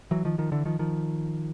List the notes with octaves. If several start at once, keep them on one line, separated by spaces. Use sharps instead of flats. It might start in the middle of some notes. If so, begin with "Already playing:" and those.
E3 F#3
D#3 F3
D#3 F3
D3 E3
D#3 F3
D#3 F3